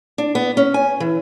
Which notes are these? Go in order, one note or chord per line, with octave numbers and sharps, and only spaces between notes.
D4
B3
C#4
G#5
E3